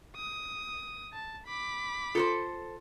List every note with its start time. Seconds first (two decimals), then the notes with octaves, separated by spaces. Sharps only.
0.16 D#6
1.13 A5
1.47 B5 D6
2.15 F4 A4 A#4 C5